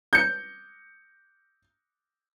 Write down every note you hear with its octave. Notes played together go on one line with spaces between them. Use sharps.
G6 C#7